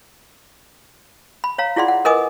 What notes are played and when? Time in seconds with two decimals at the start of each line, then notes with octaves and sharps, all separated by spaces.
1.44 B5
1.58 C#5 F5 A#5
1.76 E4 F4 G#4 D5 F#5 C6
1.88 F#5
2.05 A#4 B4 D#5 G#5 D6 D#6